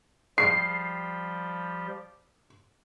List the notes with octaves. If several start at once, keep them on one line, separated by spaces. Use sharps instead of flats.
F3 G3 G4 C7